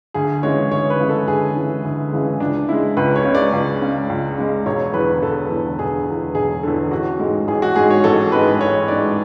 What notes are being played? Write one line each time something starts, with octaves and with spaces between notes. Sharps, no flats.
D2 G#4
C#3 E3 G#3 C#5
D2 C#5
B4
C#3 E3 G#3
A4
D2 G#4
C#3 E3 G#3
D2
C#3 E3 G#3
C#2 D4
C#3 G#3 E4
C#2 B4
C#5
C#3
G#3 D5
C#2
C#3 G#3
C#2
C#3 G#3
E1 C#5
E2 D3 B4
E1 A4
E2 D3
E1 G#4
E2 D3
E1 G#4
E2 D3 A4
A1 F#4
G#2 G#3
A1 G#4
F#4
G#2 G#3 G#4
C#5
A1 A4
G#2 G#3 B4
B4
A1 C#5
G#2 G#3 D5